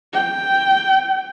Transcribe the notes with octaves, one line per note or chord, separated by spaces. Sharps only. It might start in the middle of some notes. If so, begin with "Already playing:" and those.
G5